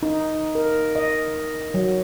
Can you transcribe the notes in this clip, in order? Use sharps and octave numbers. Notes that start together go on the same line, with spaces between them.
D#4
A#4
D#5
F#3